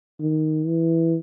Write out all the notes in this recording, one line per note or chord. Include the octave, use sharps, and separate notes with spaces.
D#3
E3